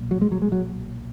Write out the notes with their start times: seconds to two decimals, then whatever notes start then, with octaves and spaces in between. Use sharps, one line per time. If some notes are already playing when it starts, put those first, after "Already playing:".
Already playing: B1 A#2
0.11 F#3
0.21 G#3
0.32 F#3
0.42 G#3
0.52 F#3